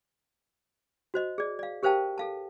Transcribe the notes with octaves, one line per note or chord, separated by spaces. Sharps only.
F#4 C5 D#5
G#4 D5
D5 F5
G4 A#4 C5 F5 G5 A5
A4 F5 A5